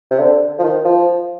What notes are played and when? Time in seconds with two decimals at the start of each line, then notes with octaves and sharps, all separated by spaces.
0.11 C3
0.19 D3
0.59 F3
0.64 D#3
0.85 F3